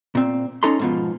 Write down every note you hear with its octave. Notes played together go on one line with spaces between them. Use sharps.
A#2 C4
C#4 D#4 A4 A#5 C6
G#2 B2 F3